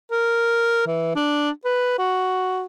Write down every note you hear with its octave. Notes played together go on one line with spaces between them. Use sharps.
A#4
E3
D4
B4
F#4